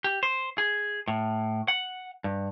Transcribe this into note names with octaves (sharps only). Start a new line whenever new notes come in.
G4
C5
G#4
A2
F#5
G2